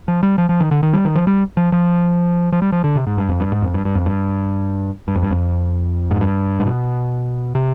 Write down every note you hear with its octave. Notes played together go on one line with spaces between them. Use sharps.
F3
G3
F3
F3
D#3
D3
D#3
G3
D#3
F3
G3
F3
F3
F3
G3
F3
D3
C3
G#2
G2
F2
G2
G#2
F2
G2
G2
F2
G2
G2
F2
G2
F2
G#2
G2
G#2
B2
C3